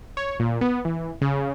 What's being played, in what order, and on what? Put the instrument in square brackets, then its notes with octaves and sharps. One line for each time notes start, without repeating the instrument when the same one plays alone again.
[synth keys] C#5
A#2
B3
E3
C#3